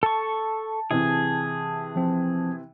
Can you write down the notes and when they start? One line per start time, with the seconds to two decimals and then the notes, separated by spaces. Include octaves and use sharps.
0.03 A4 A5 C#6
0.91 C3 E3 G#4
1.96 F3 C4